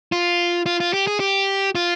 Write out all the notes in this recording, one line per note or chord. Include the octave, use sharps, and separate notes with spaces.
F4
F4
F4
G4
G#4
G4
F4